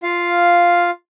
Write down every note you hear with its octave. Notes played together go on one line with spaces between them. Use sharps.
F4 F5